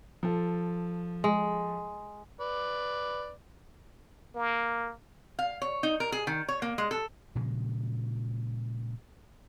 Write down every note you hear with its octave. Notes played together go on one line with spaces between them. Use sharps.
F3 A4
G#3
B4 D5
A#3
F5
C#5
D#4
A#4
G#4
D#3
C#5
A#3
G#3
A4
A#2 C#3 F3 G#3